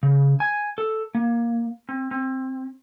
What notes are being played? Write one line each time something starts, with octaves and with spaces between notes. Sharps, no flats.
C#3
G#5
A4
A#3
C4
C4